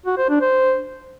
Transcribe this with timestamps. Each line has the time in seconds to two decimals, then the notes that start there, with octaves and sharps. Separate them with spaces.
0.06 F#4
0.17 C5
0.29 D4
0.41 C5